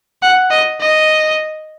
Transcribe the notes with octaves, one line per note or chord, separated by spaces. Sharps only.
F#5
D#5
D#5